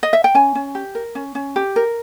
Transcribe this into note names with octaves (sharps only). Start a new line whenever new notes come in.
D#5
E5
G5
C#4 G#5
C#4
G4
A#4
C#4
C#4
G4
A#4